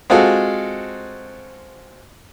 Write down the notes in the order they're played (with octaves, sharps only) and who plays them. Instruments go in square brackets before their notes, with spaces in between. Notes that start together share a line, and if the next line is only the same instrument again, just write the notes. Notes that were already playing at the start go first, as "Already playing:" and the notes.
[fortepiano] G#3 C4 F4 F#4 G#4 A4